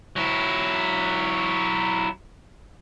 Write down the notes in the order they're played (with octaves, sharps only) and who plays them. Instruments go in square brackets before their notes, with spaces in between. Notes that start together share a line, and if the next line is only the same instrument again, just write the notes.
[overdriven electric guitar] F#3 E4